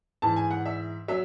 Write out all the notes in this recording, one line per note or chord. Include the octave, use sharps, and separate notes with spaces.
G#2 E3 A5
G#5
F#5
E5
F#3 E5